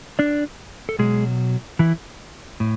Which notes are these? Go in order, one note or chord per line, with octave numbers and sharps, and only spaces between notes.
D4 D5
A4
B2 F#3 G#3 G#4
E3 E4
A2